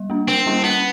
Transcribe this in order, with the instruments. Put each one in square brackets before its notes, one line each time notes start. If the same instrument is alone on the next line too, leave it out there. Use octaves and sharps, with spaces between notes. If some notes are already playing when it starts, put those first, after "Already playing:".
Already playing: [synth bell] G3
A#3 D4
[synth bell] D3 [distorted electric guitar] C4
[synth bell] G3 A#3 C#4 E4
[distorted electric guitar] B3 [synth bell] C#4